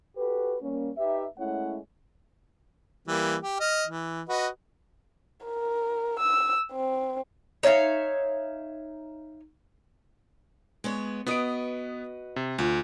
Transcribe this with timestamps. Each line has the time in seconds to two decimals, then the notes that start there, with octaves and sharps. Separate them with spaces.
0.17 F#4 G4 A4 B4
0.62 G3 A#3 C#4
0.98 D#4 G4 B4 E5
1.38 G#3 A3 C#4 E4 C#5 F#5
3.08 E3 G3 A#3
3.43 G4
3.60 D#5 F6
3.87 E3
4.29 F#4 B4 D#5
5.45 A#4
6.19 E6
6.73 C4
7.63 D#4 C#5 E5 F5
10.84 G#3 B3 C#5
11.27 B3 F#4 B4 D#5 D#6 D7
12.36 C3
12.58 D2 F4